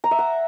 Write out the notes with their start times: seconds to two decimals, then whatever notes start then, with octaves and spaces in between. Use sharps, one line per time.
0.04 A#5
0.11 E5
0.19 F#5